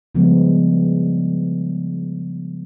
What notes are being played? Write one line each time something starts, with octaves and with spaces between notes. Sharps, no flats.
C#3 F3 G3 G#3 B3